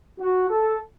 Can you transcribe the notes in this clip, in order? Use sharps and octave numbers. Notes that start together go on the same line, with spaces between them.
F#4
A4